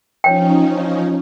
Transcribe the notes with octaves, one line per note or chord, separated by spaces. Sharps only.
F3 C#4 D#4 C#5 G5